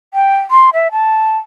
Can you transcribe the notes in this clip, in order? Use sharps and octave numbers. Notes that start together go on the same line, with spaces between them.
G5
C6
E5
A5